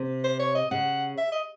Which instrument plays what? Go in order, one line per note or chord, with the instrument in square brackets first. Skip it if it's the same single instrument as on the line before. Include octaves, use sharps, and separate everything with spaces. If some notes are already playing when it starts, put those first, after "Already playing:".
Already playing: [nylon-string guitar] C3
[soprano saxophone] C5
C#5
D#5
[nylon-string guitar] C#3 [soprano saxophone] F#5
[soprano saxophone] E5
D#5